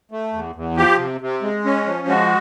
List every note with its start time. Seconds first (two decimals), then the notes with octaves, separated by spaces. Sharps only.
0.11 A3
0.33 E2
0.55 E2
0.77 F3 G4
0.98 C3
1.21 C3
1.42 G#3
1.65 C#4
1.86 F3
2.08 G#3 F#4